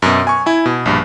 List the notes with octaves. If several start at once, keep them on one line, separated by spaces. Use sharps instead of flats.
F#2 B2
G#5 C#6
E4 G#5
B2
A#1 G2